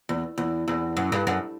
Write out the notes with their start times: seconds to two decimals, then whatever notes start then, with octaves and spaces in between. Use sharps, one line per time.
0.09 E2
0.38 E2
0.68 E2
0.97 F#2
1.12 G2
1.27 F#2